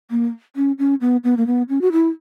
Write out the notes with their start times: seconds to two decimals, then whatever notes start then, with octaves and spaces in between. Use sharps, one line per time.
0.11 A#3
0.56 C#4
0.79 C#4
1.01 B3
1.24 B3
1.37 A#3
1.47 B3
1.69 C#4
1.81 F#4
1.92 E4